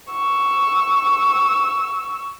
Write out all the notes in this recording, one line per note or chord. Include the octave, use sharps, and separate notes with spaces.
C#6 E6